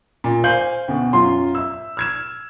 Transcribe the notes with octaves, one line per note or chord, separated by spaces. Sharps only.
A#2
C5 F5 G#5 G6 F#7
D2 B2
F#2 F4 C6
E5 E6
F6 G#6 E7